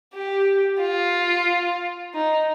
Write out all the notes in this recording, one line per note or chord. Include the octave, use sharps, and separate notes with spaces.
G4
F4
D#4